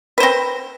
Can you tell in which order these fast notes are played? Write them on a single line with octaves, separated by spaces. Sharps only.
B4 C5 C4